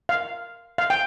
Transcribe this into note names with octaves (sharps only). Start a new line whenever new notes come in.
F5
F5
G5